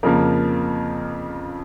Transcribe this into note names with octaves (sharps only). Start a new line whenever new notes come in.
F2 C#3 F3 A#3 A#4